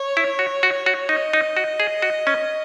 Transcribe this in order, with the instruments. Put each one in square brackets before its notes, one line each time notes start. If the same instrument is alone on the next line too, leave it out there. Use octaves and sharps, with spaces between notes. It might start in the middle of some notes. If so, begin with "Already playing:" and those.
Already playing: [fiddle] C#5
[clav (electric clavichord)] E4
F#4
F#4
F#4
[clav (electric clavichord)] D#4 [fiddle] D#5
[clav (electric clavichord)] D#4
F#4
G#4
F#4
C#4